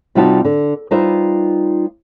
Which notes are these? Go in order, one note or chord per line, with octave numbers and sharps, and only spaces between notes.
C3 G3 D#4 F4 F#4 A5
D3
G3 D#4 F4 B4 C5 E5